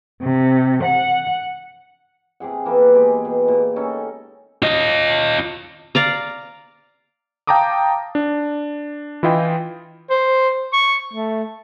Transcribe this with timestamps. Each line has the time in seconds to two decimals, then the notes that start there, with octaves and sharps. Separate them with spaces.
0.22 C3
0.84 F#5
2.40 C3 G4 G#4 F#5
2.65 E3 A#3 B3
2.94 G#3 B3 G4 G#4
3.25 B2
3.48 A#2
3.76 C#4 D#4 A4
4.62 F4 D#5
5.95 D5 F5 A#5
7.47 F5 G5 A5 A#5 D6 D#6
8.15 D4
9.23 E3 E4 F4 D#5 G5
10.10 C5
10.73 C#6
11.13 A3